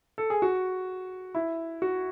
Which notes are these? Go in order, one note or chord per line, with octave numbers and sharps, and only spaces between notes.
A4
G#4
F#4
E4
F#4